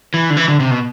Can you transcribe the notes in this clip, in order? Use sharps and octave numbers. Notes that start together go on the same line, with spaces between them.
E3
D3
E3
D3
C3
B2